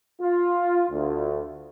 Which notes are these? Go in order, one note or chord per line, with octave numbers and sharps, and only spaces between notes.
F4
D2